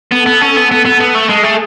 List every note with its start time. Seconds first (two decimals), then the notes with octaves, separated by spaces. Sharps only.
0.12 B3 A4
0.26 B3
0.42 C#4
0.57 B3
0.72 B3
0.85 B3
1.01 B3
1.15 A3
1.30 G#3 G#4
1.44 A3